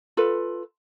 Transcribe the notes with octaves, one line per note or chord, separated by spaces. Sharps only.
F4 A4 B4